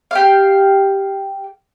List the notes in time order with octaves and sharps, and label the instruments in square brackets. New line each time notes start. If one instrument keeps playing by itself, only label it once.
[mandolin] G4 F5